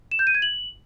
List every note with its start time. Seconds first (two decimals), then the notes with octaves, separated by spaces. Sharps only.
0.11 E7
0.19 G6
0.27 D#7
0.35 G#6
0.42 F#7